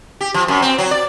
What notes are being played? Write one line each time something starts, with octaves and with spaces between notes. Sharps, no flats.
G4
F3
F#2
C4
F#3
D5